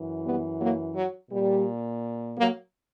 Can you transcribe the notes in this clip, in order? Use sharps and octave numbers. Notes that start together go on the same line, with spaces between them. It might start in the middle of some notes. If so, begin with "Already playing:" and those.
Already playing: F#2 E3
G3 B3
F#3 A#3
F#3
A#2 G3
F#3 A#3